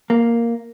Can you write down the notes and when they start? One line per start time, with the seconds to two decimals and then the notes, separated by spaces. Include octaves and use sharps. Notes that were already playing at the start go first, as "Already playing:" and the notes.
0.10 A#3